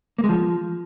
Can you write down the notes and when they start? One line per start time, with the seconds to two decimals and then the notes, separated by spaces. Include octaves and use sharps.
0.18 A#3
0.24 G#3
0.29 F3